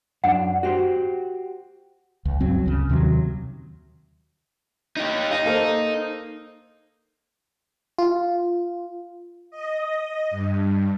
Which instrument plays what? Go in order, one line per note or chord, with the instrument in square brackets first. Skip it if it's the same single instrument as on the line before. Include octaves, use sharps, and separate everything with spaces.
[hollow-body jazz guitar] F#2 D4 [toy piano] F#5
[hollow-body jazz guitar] F#4 G4 C5
[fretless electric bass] C#2
C#2 G2 F#3 C4
C#2 C#3
D#2 C3 D#3 F#3
[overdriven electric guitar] D#4 G4
[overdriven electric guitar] D#4 [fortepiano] F5
[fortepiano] A#3 A4 C5
[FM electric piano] F4
[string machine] D#5
G2